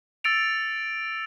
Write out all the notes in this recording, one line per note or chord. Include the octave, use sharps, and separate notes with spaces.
E6 A6 C#7 D7 F7